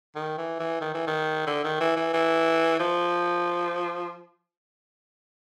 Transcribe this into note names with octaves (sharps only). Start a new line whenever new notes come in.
D#3
E3
E3
D#3
E3
D#3
D3
D#3
E3
E3
E3
F3